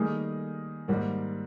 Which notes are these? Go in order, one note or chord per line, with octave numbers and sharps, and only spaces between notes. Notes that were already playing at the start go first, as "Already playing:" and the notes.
Already playing: D#3 G3 A3 A#3 D#4 G#4
G#2 D#3 G3 A#3